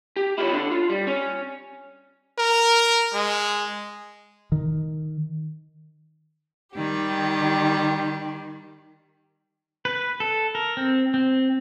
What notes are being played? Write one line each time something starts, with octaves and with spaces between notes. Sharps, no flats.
G4
E4 F4 G4 C5 C#5
D4 A4
F4
G3
C#4 C#5
A#4
G#3
D#3
D#3 G3 G4
B4
A4
A#4
C4
C4